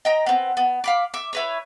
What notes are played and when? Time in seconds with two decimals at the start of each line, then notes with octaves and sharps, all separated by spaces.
0.05 D#5 G5 A#5
0.26 B3 C4
0.57 B3
0.84 F5 B5 D6
1.14 E5 D6
1.33 E4 B4 C#5